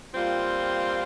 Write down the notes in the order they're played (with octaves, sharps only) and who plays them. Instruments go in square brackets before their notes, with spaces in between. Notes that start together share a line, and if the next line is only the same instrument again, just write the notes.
[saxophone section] A#2 G3 C4 F4